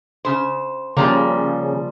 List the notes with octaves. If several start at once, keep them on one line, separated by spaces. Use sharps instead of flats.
C#3 C5
C#3 F3 G3 A#3